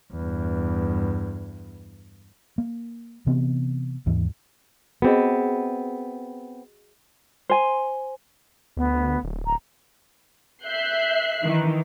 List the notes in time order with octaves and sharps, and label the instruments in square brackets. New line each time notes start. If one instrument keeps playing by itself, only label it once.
[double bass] E2 G2
[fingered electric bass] A#3
C3 E3 B3 C4
D#2 G#2 E3
[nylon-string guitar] B3 C4 [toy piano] F#4 G#4 D#5
[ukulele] C5 G#5
[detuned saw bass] D2 [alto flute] B3
[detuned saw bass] D1
[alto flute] A#5
[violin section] E5 F#6 C7 [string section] G6
[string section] D#3 E3 D#4